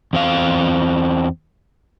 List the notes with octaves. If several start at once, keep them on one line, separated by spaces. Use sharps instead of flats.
E2 C4 F5